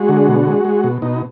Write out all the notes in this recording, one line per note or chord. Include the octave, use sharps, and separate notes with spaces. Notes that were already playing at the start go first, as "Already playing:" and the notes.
Already playing: G#3 F#4
D3
B2
G#3
G#3
B2
B2 D#4